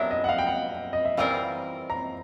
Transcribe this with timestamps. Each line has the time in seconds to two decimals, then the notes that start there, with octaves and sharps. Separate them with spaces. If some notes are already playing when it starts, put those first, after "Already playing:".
Already playing: F#3 B3 D4 G4 A#4 E5
0.11 D#5
0.24 F#5
0.29 F5
0.38 G5
0.47 F#5
0.93 D#5
1.05 E5
1.17 E3 G3 C4 F4 A#4 F5
1.90 A#5